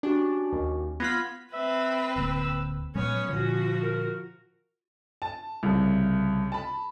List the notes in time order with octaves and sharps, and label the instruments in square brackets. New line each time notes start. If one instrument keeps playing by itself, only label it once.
[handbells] C#4 F#4 G4 [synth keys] D4
[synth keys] D#2
[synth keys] B3 F4 B5 [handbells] G#6 A#6
[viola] C4 B4 [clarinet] E5
[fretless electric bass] D1 D3 A#3 [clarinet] E6
[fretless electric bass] A#2 F#3 G#3 [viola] B3 C#5 [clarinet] C#4
[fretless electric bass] A#2 D3 [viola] F3 F#4
[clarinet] A#4
[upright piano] A5
C2 C#3
A5 B5